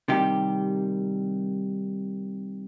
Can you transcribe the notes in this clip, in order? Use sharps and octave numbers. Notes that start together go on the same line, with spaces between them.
C3 D#3 G3 G4